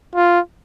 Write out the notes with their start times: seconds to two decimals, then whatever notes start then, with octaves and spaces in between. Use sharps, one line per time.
0.15 F4